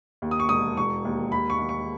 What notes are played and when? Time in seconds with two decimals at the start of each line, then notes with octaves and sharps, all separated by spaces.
0.22 D#2
0.31 D#6
0.40 C#6
0.49 E1 D#6
0.77 E1 C#6
1.05 D#2
1.32 D#2 B5
1.50 C#6
1.59 D#2
1.69 C#6